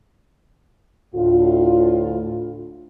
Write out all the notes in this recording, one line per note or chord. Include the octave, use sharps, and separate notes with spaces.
D2 A2 F4